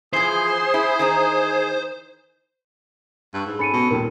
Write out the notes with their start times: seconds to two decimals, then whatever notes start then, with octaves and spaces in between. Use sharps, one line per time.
0.13 E3 F3 G#4 C5
0.74 E4
0.99 D#3 E3 D#4
3.34 G2 C#6 E6 F#6
3.47 G#2
3.59 C#4 A4 G#5 B5 C#7 D#7
3.73 B2 A5 C#6
3.91 D#2 A#2 G3 A#4